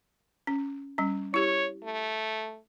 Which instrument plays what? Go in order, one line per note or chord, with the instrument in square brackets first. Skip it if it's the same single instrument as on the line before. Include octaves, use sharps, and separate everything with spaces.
[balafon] C#4
G3 C#4
[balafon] E4 G4 [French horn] C#5
[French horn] A3